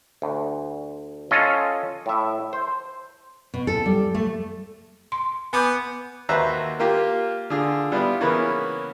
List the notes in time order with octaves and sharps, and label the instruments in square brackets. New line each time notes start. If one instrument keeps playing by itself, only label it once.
[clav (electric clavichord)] D2
C#4 F4 A4 D#5
A2 E5
C5
[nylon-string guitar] B2
A4
G3
A3
[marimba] C6
[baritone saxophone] B3 [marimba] G#5 D6 G6
[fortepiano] D#2 F#4 B4 C5 E5 A#5
A#3 F4 G4
D3 F4 G#4
G3 B3 E4 F4
C#3 E3 A#3 B3 C#4 E4